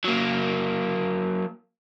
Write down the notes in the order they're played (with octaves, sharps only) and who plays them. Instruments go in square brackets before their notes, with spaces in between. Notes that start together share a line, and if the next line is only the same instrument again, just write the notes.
[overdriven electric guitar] F#3 A#3